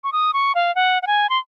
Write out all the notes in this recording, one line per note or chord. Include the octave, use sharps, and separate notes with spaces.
C#6
D#6
C#6
F5
F#5
F#5
G#5
C6